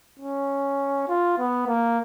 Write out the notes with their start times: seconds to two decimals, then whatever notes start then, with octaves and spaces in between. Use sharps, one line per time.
0.19 C#4
1.08 F4
1.38 B3
1.67 A#3